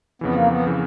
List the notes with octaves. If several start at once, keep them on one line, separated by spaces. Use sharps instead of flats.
F2 C#3 E3 B3
A#3
B3
C#3 E3